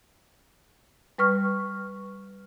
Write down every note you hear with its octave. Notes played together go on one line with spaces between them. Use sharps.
G3 B4 C#6 F6